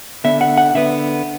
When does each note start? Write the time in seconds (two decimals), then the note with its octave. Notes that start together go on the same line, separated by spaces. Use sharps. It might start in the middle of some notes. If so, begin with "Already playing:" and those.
0.24 D3 B3 E5
0.41 F#5
0.58 F#5
0.74 D3 B3 E5